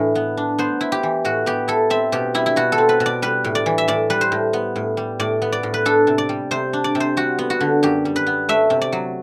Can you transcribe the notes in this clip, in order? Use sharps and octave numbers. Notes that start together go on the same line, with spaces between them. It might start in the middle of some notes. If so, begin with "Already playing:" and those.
Already playing: A2 E3 D4
B3
D4
B3 C5
E4
G4
E3
A2 F#4
B3 G4
E4 A4
C4 E5
B2 G4
G3 E4
E4
B2 F#4
A4
C4
B4
B2
D5
G3 B4
A2
D5
E3
E5
A2 D5
G3 B4
C5
A2
B3
A2
G3
A2 D5
B3
D5
A2
B4
D4 A4
C3
D5
G3
C3 C5
D4
D5
C3
C5
G3 F#4
B3
F#4
D3
F#2 G4
G3
B4
B3
A3 E5
C3
D5
F#3